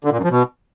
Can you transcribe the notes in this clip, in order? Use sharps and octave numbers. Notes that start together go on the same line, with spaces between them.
D3
A#2
F#2
F3
B2